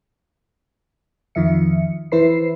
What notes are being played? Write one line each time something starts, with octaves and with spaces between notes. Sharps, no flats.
F2 D#3 F3 E5 C#7
E3 E4 B4 C5 B5 C7